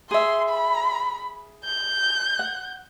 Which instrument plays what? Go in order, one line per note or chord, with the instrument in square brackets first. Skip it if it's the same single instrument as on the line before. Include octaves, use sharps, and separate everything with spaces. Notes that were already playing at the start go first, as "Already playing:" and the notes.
[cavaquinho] G#4 E5 [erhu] C6
[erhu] B5
G6
[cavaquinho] F#5